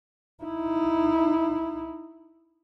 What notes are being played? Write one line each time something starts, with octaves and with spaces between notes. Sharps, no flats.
D#4 E4